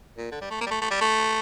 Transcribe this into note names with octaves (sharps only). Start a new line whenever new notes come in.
A#2
D3
G3
A3
A#3
G3
A3
A3
G3
A3